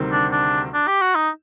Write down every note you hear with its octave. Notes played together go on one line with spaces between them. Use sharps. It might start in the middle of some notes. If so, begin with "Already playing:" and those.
Already playing: D2 C3 D#3 G3 C4
D4
D4
D4
G4
F#4
D#4